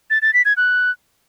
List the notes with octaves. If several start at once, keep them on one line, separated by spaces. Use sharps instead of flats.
A6
A6
B6
G#6
F#6